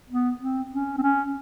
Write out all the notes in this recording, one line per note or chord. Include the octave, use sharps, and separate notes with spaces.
B3
C4
C#4
C4
C#4